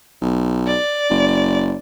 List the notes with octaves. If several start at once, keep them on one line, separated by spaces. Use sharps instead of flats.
B1
D5
F#1